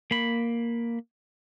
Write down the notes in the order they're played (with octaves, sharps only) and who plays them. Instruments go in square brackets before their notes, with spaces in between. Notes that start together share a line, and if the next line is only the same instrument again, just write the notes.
[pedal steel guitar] A#3 B5